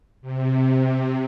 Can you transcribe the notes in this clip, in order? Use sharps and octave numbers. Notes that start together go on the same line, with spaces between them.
C3